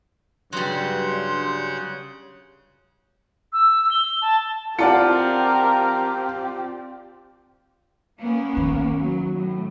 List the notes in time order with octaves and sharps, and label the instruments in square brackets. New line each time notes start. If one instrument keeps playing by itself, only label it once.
[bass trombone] G2 [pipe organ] C#3 F#5 G6 [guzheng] F#3 G3 [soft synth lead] C6
[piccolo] E6
G7
A5
[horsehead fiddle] C4 G4 [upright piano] F4 D5 [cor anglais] A#4 [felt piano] F#5 A5 C#7
[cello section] A#3 B3 C#4
[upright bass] D#3
[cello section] F#3
A2